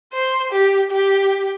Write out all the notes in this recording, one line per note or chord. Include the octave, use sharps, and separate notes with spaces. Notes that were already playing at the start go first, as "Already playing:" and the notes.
C5
G4
G4